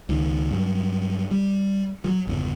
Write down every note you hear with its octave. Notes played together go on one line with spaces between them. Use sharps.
C#2 D#3
G2 F#3
G3
F3 F#3
G1 E2 C#3